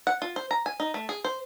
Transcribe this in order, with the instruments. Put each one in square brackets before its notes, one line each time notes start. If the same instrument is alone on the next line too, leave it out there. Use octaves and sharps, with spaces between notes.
[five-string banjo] F#5
F4
C5
A#5
G#5
D#4
A3
G#4
C5